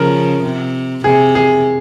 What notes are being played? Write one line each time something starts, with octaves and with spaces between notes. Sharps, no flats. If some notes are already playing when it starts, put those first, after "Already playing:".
Already playing: C#3 F3 A#4
C3
C3 G#4
G#4